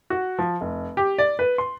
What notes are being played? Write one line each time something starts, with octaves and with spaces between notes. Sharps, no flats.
F#4
F3
F1
G4
D5
B4
C6